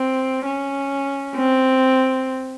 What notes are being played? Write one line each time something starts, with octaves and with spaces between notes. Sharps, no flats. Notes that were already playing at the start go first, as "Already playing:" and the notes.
Already playing: C4
C#4
C4